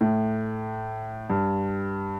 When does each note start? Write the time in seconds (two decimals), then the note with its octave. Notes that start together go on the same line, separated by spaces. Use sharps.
0.01 A2
1.30 G2